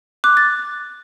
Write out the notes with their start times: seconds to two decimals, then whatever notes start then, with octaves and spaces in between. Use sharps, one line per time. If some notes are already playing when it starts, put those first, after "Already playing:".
0.24 D6 F#6
0.37 A6